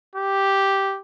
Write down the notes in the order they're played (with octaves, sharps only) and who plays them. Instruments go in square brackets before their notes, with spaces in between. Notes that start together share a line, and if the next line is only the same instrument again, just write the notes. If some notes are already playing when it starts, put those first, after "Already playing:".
[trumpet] G4